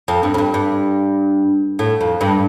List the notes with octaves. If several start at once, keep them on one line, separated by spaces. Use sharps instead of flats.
F2
G2
F2
G2
G2
A2
F2
G2